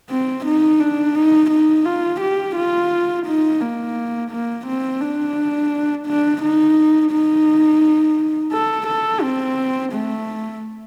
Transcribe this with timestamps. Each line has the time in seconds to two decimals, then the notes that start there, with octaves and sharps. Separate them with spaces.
0.10 C4
0.46 D#4
0.80 D4
1.15 D#4
1.51 D#4
1.85 F4
2.21 G4
2.56 F4
3.26 D#4
3.61 A#3
4.31 A#3
4.67 C4
5.01 D4
6.07 D4
6.42 D#4
7.12 D#4
8.52 A4
8.88 A4
9.23 C4
9.93 A3